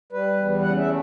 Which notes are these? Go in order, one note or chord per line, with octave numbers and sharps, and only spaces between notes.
G3 B4
E2
C#3 F#5
E5
A3